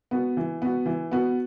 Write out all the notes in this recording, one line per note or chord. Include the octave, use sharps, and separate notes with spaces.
B3 F#4
E3
B3 F#4
E3
B3 F#4